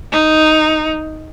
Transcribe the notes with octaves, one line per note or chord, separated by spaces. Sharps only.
D#4